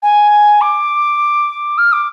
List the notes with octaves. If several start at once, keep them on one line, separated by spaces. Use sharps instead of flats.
G#5
D6
F6
D6